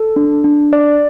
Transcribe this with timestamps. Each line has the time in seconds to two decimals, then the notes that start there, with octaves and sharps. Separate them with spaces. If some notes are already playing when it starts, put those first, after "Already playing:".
Already playing: A4
0.16 D4
0.44 D4
0.73 D5